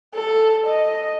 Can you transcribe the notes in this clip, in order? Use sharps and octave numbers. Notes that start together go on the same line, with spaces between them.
A4
D#5